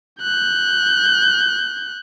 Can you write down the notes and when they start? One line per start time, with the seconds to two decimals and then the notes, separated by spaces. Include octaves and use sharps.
0.21 F#6 G6